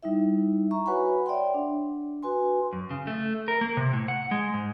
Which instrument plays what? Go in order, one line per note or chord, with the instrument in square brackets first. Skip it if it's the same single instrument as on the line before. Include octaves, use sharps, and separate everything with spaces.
[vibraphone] G3 D#4 E4 E5
E5 A#5 C#6
F#4 B4 C#5 F#5 G#5 B5
C#5 D5 E5 F#5 G5 C6
D4
F#4 B4 G#5 C6
[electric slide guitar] F#2
C#3
A3
A#4
A#3
C3
A2
F#5
G#3
G#2